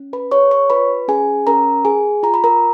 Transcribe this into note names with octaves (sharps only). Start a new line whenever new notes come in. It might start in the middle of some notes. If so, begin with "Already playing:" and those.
Already playing: C#4
B4 B5
G#4 C#5 C#6
C#5 C#6
F4 B4 B5
C#4 G#4 G#5
C#4 A#4 A#5
G#4 G#5
F4 A#5
B5
A#4 A#5